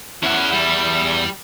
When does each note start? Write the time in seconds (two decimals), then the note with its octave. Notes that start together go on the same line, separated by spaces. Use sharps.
0.23 E2 C#4 E4 F#5
0.53 G3